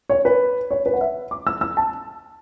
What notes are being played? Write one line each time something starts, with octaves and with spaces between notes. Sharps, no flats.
C#5
B4
C#5
B4
F#5
E5
D6
E6
E6
A5